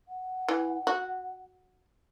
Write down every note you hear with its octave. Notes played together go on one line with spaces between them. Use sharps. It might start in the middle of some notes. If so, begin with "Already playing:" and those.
F#5
E3
F#4